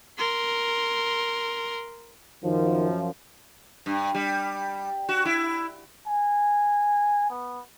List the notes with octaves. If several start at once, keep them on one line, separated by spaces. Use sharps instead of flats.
A#4 C6
F#2 D#3 F3
G2
G3
F#4
E4
G#5
B3